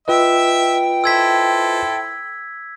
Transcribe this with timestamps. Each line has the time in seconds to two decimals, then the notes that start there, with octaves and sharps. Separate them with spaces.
0.08 F4 B4 D#5 E5 G5 E6
1.04 E4 A4 C5 E6 G#6 B6